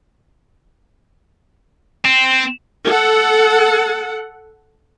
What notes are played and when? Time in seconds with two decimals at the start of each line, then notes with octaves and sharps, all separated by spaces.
2.05 C4
2.86 A4 F#5